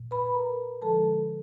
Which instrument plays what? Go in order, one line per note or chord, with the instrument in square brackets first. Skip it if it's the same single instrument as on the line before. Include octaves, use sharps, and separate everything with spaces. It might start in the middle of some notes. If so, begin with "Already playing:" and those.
Already playing: [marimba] A#2
B4 B5
A#4 A#5
D3 F3 G#3 A4 A5